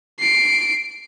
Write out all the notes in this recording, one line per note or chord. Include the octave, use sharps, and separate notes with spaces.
C7 D7